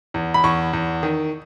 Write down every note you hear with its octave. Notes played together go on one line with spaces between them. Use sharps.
E2
B5
E2 C#6
E2
D#3